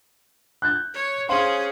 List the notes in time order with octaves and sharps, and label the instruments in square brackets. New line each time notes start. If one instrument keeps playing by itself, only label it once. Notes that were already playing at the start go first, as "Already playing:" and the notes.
[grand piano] F#6 G6 A6
[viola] C#5
[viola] C#4 G#4 [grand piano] C5 F5 C6